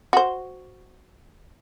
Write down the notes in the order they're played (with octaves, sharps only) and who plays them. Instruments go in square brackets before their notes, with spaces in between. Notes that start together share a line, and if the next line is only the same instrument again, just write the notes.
[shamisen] F#4 C5